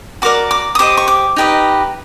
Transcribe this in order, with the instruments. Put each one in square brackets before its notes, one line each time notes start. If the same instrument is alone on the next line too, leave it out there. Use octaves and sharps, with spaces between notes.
[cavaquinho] F#4 A#4 D5 D6
D6
D#6
G4 C5 D#5 D6
C#6
D6
D#4 G4 B4 D#5